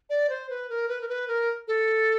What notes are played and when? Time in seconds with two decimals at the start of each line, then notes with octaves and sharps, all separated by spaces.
0.10 D5
0.29 C5
0.50 B4
0.69 A#4
0.88 B4
1.01 A#4
1.08 B4
1.28 A#4
1.68 A4